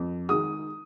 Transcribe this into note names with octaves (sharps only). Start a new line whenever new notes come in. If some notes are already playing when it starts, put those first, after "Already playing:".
Already playing: F2
D#3 G#3 D#6